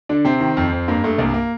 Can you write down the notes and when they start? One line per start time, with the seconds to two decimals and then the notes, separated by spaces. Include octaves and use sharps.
0.09 D3 D4
0.24 C3 C4
0.40 D#3
0.57 F2
0.72 F2
0.88 G2 A#3
1.04 G2 A3
1.18 C2 A#3
1.34 A#3